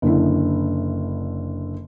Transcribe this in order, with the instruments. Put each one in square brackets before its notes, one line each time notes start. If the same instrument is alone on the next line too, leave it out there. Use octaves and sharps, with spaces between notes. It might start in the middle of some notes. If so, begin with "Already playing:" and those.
[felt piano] F#1 D3 E4